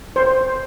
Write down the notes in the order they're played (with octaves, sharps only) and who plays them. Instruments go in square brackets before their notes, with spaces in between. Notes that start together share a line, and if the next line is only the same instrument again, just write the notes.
[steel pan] C5